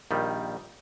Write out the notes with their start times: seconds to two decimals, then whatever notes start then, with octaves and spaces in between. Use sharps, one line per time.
0.11 A#1 D#3 G3